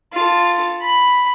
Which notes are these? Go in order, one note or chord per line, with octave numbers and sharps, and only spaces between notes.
F4 A4
B5